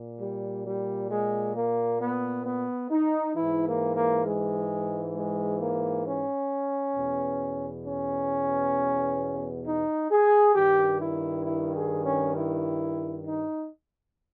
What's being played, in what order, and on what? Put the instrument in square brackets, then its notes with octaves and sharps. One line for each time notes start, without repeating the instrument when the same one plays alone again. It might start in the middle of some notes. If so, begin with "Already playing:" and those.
Already playing: [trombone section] A#2
G3
G3
G#3
A#3
B3
B3
D#4
G#2 E3 E4
A#3
A#3
G#3
G#3
A#3
C#4
E2 B2
C#4
D#4
G#4
G2 D#3 G4
E4
E4
G#4
C#4
E4
D#4